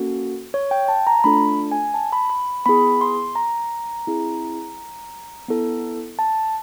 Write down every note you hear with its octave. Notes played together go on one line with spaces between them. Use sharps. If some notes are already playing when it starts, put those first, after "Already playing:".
Already playing: A#3 C#4 F#4 A4
C#5
G5
A5
A#5
A3 D4 F4 A4 B5
G#5
A5
B5
B5
B3 E4 G#4 B5
C6
A#5
C4 E4 G#4
B3 E4 A4
A5